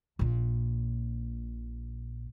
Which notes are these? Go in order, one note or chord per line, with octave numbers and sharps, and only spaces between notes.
A#1 A#2